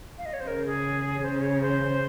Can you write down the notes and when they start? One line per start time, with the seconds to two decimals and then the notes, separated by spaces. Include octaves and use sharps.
0.18 F5
0.26 D#5
0.33 C#5
0.40 C5
0.47 C#3 A#4
0.66 G#4
1.23 C#3 C5
1.41 C#5
1.61 C5